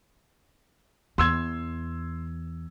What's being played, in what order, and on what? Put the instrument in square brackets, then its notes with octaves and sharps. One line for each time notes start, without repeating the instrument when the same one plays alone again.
[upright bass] E2 [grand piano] C6 E6 G#6